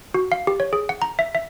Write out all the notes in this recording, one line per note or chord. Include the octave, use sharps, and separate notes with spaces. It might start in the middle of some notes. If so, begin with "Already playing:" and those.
F#4
F5
G4
C#5
G#4
F#5
A#5
E5
E5